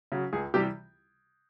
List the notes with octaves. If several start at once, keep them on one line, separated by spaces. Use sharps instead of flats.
C#3 F#3
C#2 G#4
C3 E3 G3 G4